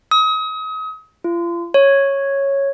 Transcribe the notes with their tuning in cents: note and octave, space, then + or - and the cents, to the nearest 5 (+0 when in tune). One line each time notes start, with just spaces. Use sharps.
D#6 +35
F4 -35
C#5 -5